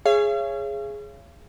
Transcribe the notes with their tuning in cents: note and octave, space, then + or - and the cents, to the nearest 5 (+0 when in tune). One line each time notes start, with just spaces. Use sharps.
G#4 +0 C#5 +0 F5 -45